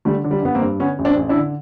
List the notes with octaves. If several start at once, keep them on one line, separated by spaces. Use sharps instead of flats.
D3 G3 A3
D3
G3
G2 B3
A#3 C4
G2
D3 B3 C#4
A1
C4 D4
A1
D4 E4
D3